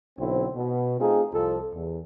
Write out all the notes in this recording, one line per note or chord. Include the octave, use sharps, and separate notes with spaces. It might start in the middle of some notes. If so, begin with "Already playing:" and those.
B1 D3 C4 E4 C5
B2
A3 C4 D#4 F4 G#4
C2 F2 F3 A4
E2